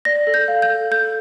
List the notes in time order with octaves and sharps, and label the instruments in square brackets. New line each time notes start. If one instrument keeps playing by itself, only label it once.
[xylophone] D5 A#6
A4
G6
F5
G6
A4
A4 G6